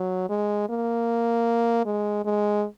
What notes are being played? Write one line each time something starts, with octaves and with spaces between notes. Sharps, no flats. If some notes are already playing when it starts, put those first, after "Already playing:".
Already playing: F#3
G#3
A#3
G#3
G#3